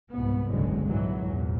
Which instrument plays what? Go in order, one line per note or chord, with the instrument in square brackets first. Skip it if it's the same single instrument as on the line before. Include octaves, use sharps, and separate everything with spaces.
[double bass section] C2 G#2 B2 B3
F#1 C2 D3 F#3 G#3
G#1 A#2 E3 F#3
E2 A#2